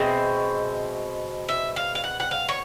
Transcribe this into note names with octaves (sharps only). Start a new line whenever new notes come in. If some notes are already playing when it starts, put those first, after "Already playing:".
Already playing: B2 G#3 C4 E5
E5
F5
F5
F#5
F#5
F5
C#5